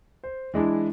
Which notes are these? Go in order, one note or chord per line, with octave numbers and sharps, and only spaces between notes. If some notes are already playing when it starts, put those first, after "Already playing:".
C5
E3 G#3 D4 E4